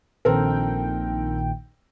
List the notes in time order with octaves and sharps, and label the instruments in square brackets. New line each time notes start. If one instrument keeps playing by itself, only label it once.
[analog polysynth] A#1 D#3 G5 [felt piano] C4 A4 A#4